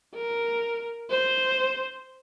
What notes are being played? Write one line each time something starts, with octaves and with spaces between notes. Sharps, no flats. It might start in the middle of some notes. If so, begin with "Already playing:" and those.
A#4
C5